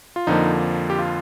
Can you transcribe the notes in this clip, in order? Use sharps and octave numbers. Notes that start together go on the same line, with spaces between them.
F4
F2 D3 F3 A#3 D#4
G4
F4